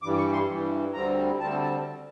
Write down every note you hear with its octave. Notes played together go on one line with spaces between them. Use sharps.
G2 E3 G3 D6
C#6
C6
G2 E3 G3
D2 D3 G3 C4 A#5
D2 D3 G3 C4 A5
A5